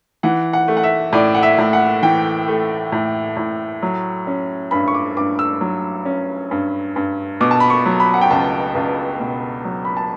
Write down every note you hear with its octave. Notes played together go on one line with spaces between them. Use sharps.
E3 F#5
F#5
A3
F#5
E5
A2 D5
F#5
E5
A2
F#5
E3 G5
A3
A2
A2
F#3
C#4
G2 B5
C#6
D6
G2 D6
E6
F#3
C#4
G2
G2
B2 D6
A5
B5
C#6
F#3
B5
F#5
G5
C#2 A5
C#2
B2
F#3
B5
A5